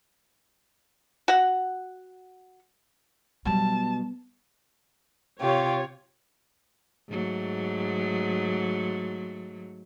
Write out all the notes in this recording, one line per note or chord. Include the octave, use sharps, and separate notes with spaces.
F#4 F#5
B2 F#3 G3 A5
C3 F4 G4 C#5
G#2 F#3 A3